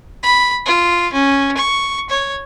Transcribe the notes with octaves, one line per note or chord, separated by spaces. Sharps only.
B5
F4
C#4
C#6
C#5